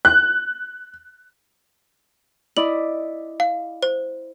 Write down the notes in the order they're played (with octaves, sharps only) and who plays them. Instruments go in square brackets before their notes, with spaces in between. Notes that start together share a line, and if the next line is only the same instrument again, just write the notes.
[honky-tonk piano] F#6
[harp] E4 D5 D#5 [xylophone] F#7
[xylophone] F5
C5